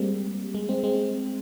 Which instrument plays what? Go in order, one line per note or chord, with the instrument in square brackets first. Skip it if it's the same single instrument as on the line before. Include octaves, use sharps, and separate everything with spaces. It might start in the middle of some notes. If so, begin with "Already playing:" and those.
Already playing: [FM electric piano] G3 G#3 A#3 C4
G#3
G#3 C4
G#3 C4